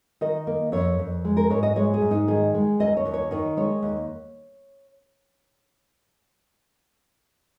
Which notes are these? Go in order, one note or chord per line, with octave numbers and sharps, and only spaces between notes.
D#3 D#5
A#3
F2 C#5
F2
G#3
A#4
G#2 C#5
D#5
G#3 C#5
G#4
G#2
D#4
D#3 G#4
G#3
D#2 D#5
C#5
D#2
C#5
D#3 C#5
G#3 C#5
D#2